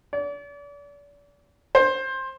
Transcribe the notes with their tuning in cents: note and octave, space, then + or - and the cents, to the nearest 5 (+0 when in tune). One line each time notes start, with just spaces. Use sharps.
D5 -40
C5 +15